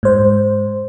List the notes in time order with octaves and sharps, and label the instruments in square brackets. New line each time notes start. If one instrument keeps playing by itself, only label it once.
[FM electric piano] G#2 C5